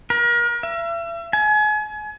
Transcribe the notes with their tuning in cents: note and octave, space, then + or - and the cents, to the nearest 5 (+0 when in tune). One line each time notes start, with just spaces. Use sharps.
A#4 +35
E5 +40
G#5 +35